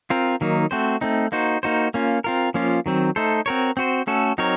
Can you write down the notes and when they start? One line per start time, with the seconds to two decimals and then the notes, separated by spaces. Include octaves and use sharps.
0.10 C4 F4 A#4
0.41 D#3 F#3 A#3 D#4
0.71 A3 C4 F#4 C5
1.01 A3 C4 D#4
1.32 A#3 D#4 F#4 C5
1.63 A#3 D#4 F#4 C5
1.94 A#3 C#4 F4
2.24 C4 F4 A#4
2.54 F3 A#3 C#4 F4
2.86 D#3 F#3 C4
3.16 A3 D#4 A4 C5
3.46 C4 F#4 A#4 C#5
3.77 C4 F#4 C5
4.07 A3 C#4 F#4 A4
4.38 F#3 C4 D#4 A#4 C#5